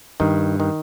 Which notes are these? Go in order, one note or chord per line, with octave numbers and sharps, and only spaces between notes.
G2 D#3
D#3